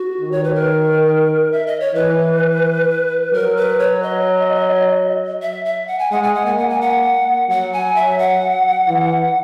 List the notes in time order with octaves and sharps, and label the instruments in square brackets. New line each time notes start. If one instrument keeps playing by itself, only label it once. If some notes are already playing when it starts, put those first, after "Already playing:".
Already playing: [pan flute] F#4
[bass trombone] D#3
[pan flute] C#5
B4
A#4
E5
D#5
C#5
[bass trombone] E3 [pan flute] B4
[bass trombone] F#3 [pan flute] A#4
[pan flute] B4
C#5
D#5
E5
E5
F#5
G#5
[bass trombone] G#3 [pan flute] F#5
[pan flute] G#5
F#5
[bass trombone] A#3 [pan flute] G#5
[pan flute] F#5
G#5
F#5
[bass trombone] F#3 [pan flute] F#5
[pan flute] G#5
E5
F#5
[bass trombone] E3